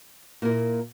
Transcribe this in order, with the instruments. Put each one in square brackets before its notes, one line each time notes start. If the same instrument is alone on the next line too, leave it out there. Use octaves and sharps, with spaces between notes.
[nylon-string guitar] A#2 A#3 E4 A#4